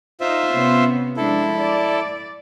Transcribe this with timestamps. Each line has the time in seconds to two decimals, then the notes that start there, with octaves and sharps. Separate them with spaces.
0.21 D#4 F4 C5 E5
0.52 C3 B3 C#4
1.17 F3 G#3 D4 E4 A4
1.58 D5